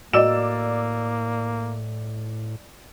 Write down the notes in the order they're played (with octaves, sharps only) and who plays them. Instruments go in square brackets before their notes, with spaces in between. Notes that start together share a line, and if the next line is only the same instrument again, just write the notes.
[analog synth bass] A2 [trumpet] A#3 [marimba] F#4 D#5 [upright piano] D5 E6 E7